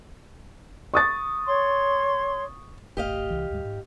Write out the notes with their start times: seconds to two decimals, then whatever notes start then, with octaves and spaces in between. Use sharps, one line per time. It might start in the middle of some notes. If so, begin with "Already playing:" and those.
0.94 C#6 D#6 A6
1.46 C#5 C6
2.97 D#1 G#1 A3 G4 D#5 F5
3.30 C2 E3
3.50 D2 G#2 G3
3.65 G#2